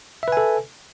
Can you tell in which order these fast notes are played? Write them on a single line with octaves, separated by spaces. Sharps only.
E5 B4 G#5 A4